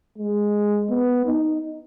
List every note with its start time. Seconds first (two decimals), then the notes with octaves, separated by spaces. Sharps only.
0.18 G#3
0.90 B3
1.26 D#4